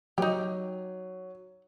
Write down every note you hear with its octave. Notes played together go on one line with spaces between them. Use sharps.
F#3 D#4 G4